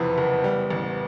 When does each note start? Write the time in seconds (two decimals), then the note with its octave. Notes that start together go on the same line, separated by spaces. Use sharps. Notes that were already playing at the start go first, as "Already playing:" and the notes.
Already playing: F#1 F2 C3 E3 B3
0.18 F#1
0.44 G3
0.71 A1